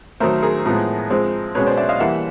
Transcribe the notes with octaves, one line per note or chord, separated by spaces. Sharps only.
D#3 F#3 A3 A#4 C5
G#4 A#4
A2 F3 G#3 B3
F3 G#3 C4
B2 G#3 C#4 B4 C#5
C5 D5
D5 E5
D#5 F5
E3 G3 A#3 E5 F#5